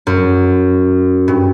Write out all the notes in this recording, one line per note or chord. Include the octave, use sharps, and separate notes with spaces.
F#2
G2